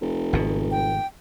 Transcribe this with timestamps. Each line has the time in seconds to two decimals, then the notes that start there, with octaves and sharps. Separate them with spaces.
0.01 F1
0.33 G#1 B2
0.71 G5